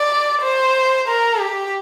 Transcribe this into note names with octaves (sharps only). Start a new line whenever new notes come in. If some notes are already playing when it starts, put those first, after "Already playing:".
Already playing: D5
C5
A#4
G4